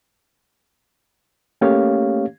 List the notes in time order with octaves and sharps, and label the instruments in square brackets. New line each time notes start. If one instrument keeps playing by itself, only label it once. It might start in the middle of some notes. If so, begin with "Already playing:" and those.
[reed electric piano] A3 A#3 C#4 G4 C#5 F5